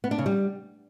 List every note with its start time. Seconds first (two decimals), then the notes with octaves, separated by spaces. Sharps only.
0.04 B3
0.11 D4
0.18 C#3
0.26 G3